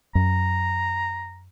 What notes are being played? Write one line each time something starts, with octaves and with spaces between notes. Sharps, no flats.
F#2 A#5